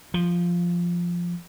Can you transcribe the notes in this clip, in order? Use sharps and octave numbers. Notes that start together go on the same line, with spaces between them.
F3